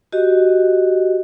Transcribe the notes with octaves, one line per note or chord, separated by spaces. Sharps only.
F#4 G4 D#5